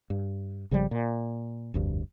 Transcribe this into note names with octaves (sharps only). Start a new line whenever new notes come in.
G2
G#1 C#3 F3 G3
A#2
F1 D2 G2